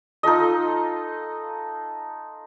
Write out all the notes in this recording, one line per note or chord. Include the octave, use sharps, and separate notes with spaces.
D#4 F4 A4 D#5